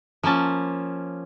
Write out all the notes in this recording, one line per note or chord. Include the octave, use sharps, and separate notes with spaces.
F3 A#3 C#4 A5